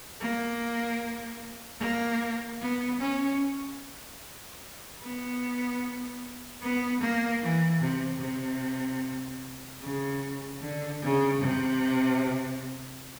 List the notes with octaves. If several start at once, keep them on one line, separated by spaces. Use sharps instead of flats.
A#3
A#3
B3
C#4
B3
B3
A#3
E3
C3
C3
C#3
D3
C#3
C3